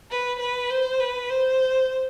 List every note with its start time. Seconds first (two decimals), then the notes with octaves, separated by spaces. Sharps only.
0.11 B4
0.40 B4
0.70 C5
1.00 B4
1.30 C5